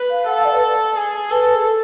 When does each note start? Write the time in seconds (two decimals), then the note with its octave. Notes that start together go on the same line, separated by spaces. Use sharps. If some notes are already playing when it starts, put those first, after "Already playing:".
Already playing: B4
0.10 F5
0.27 A4 F#5
0.36 F5
0.45 D5
0.53 B4
0.96 G#4
1.31 A4 B4
1.55 G#4
1.65 A4